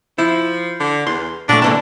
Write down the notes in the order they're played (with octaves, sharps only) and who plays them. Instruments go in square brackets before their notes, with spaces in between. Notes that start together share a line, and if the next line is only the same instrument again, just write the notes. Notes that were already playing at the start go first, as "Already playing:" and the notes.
[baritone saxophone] F3 [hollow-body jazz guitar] E4
[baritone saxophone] D3
[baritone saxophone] E2 [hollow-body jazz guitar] C6
[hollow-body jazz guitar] A#2 A3 [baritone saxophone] D4
[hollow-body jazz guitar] D3 A#3 A5 [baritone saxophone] E3